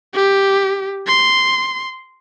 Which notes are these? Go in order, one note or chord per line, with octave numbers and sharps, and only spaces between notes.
G4
C6